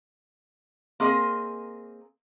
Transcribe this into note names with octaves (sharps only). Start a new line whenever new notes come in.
A#3 C4 G#4 A#4 D#5